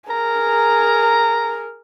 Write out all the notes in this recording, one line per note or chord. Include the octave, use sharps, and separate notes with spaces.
G#4 A#4 A#5